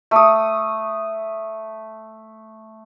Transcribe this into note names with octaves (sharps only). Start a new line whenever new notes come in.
A3 D#6